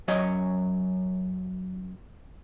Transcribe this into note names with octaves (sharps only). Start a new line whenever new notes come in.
F#2 F#3 C#5 D#5